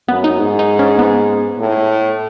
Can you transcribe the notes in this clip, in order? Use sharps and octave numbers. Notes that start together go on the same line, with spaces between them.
F#2 B3
D#4
G#2
D#4
C#4
B3
A2